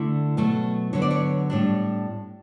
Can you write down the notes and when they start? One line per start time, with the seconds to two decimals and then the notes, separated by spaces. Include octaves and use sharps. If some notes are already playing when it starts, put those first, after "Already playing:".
Already playing: D3 A3 E4
0.37 B2 F#3 A3 E4
0.93 D3 F#3 B3 C#5
1.02 D5
1.11 C#5
1.50 A2 G3 D4